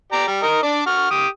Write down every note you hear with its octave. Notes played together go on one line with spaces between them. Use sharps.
G4 D5 A#5
G3
A#4 D#5
D4 D5
F#4 F6
G4 D#6